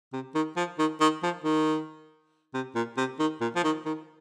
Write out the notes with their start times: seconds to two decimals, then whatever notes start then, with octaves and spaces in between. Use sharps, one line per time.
0.13 C3
0.35 D#3
0.57 F3
0.79 D#3
1.01 D#3
1.23 F3
1.44 D#3
2.54 C3
2.75 A#2
2.97 C3
3.19 D#3
3.41 A#2
3.56 F3
3.64 D#3
3.85 D#3